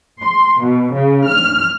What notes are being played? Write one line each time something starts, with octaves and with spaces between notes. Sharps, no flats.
C6
B2
C#3
F6